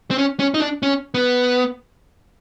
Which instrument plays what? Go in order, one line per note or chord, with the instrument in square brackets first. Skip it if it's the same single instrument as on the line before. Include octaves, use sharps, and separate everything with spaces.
[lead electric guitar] C4
C#4
C#4
D#4
D4
C#4
B3